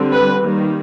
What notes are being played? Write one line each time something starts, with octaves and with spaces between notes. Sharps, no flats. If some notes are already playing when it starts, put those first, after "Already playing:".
Already playing: D3 G3 C4
B4
D#3 G3 A#3